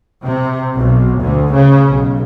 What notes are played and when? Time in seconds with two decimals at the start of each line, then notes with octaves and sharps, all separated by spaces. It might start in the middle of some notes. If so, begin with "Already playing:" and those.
0.25 C3
0.77 B1
1.21 D2
1.55 C#3
1.89 B1